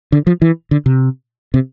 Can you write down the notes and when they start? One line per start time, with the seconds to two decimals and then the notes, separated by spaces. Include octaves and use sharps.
0.12 D3
0.27 F3
0.42 E3
0.71 D3
0.86 C3
1.54 C3